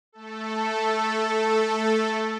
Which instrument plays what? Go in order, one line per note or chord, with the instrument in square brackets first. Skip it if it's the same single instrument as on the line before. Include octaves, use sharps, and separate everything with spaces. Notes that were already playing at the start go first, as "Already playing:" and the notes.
[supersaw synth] A3 A4